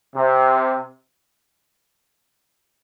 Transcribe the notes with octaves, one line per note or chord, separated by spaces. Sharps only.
C3